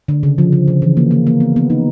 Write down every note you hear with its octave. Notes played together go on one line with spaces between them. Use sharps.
D3
C#3
F3
C#3
C#3
E3
A#3
A#3
A#3
B3
B3
D#4